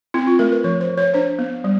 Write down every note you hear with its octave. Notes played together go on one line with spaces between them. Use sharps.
C4 E4
F4
A3 A#4
B4
F3 C#5
C5
F3
C#5
D4 C5
B3
G3